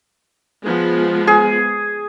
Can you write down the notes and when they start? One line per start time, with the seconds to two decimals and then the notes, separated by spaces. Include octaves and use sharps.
0.64 F3 G#3 B3
1.27 G#4